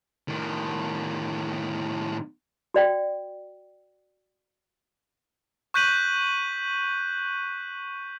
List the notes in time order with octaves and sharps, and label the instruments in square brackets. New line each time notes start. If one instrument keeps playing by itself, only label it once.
[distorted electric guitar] A2 D#3
[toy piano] F#4 D5 G5
[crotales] C#6 F#6 G6 B6 D#7 F#7